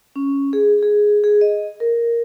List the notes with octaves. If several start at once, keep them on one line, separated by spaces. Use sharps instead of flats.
C#4
G#4
G#4
G#4
D#5
A#4